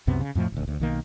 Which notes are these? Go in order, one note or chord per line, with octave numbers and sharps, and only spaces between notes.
C2 F#2 C3 B3
C#3
F2 A2 F3 A3
D#1 D2
D2
B1 D#3 A#3